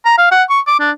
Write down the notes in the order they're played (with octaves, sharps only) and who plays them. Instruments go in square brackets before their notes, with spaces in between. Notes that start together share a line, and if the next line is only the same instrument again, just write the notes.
[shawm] A#5
F5
F#5
C#6
D6
D4